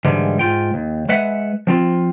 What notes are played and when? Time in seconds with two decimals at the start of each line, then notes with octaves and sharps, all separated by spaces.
0.05 G#2 D3 E3 G3 G#3
0.39 G#2 F4 G5
0.74 D#2
1.09 G#3 B4 E5 F#5
1.67 F3 C4 F4